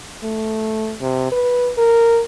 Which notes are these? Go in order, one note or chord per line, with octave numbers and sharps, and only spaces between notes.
A3
C3
B4
A#4